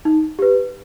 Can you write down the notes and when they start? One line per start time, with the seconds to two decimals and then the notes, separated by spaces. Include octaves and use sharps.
0.05 D#4
0.39 G4 B4